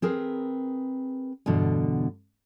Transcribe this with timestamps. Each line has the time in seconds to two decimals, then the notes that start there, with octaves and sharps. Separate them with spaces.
0.02 C4 G#4 A#4 B4
1.46 E2 G2 B2 D3